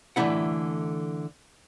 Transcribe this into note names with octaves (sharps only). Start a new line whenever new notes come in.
D3 E3 A3 D#4 E4 F#5